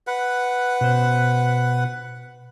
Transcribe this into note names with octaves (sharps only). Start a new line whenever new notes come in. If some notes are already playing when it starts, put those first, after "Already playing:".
B4 F#5
B2 C5